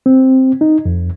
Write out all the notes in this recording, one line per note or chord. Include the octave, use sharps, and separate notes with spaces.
C4
D#4
F2